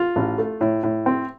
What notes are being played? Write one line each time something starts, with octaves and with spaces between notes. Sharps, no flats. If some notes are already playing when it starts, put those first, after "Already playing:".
Already playing: F4
A1
A3
A2
A2
C4